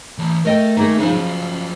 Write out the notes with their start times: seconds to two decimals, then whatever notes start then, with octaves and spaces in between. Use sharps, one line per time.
0.18 E3 C#5
0.45 A3 A#4 D#5 G5
0.77 D#3 A#3 G#4
0.99 C#3 F3 D#4 G#5
1.13 F#3 G#4